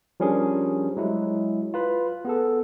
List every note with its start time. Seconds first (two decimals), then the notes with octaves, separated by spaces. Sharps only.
0.20 F3 G3 C#4 D4 G#4 A#4
0.97 F#3 G#3 E4
1.74 F4 B4 B5
2.25 B3 G#4 A4